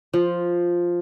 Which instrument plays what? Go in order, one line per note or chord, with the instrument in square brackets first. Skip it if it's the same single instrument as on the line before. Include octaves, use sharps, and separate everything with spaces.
[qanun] F3